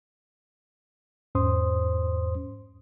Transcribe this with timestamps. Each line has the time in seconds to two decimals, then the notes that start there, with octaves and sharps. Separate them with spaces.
1.35 E2 G#2 C#4 C5 C6 D#6